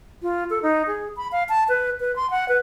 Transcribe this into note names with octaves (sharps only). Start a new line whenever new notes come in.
F4
A4
D#4
G#4
B5
F5
A5
B4
B4
C6
F#5
B4